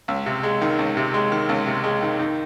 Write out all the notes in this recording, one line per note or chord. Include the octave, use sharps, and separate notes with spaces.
C#2
C3
G#3
D#3
C#2
C3
G#3
D#3
C#2
C3
G#3
D#3
D#3